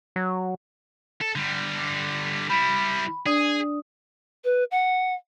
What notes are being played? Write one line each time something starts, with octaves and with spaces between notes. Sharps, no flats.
F#3
A4
D3 G3
G3 E4 B5
D4 G#4 D5 D#6
B4
F#5